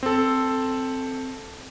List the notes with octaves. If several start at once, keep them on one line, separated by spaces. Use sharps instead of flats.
C4 A4